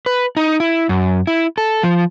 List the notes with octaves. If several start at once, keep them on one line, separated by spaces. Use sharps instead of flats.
B4
D#4
E4
F#2
E4
A4
F3